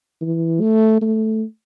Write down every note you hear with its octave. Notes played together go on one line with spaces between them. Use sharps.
E3
A3
A3